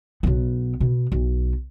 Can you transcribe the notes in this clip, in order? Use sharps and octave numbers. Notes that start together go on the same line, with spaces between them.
B1 B3
B2
B1